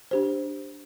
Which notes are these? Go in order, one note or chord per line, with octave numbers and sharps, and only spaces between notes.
D4 G4 C5